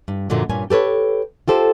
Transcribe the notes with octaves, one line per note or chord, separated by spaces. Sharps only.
G2
F#2 A#2 D3 F3 F#3
G2 A#2 C#4 G#5
G4 A4 B4 C#5
F4 G4 A4 C5